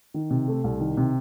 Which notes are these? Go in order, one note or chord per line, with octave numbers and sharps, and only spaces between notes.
D#3
C3
A3
C2
D#3
C3